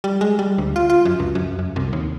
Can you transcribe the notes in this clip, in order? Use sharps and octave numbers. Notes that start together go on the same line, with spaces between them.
G3
G#3
G3
D2
F4
F4
F#2
C#2
F#2
F#2
C2
D#2